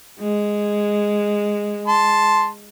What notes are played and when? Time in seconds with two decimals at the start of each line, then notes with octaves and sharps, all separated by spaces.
0.19 G#3
1.87 A5 C6